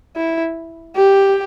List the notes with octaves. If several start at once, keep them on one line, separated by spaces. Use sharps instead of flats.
E4
G4